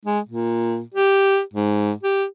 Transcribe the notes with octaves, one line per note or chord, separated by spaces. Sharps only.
G#3
A#2
G4
G#2
G4